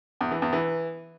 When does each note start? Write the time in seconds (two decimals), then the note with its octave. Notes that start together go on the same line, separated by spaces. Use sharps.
0.21 E2
0.31 E3
0.42 E2
0.53 E3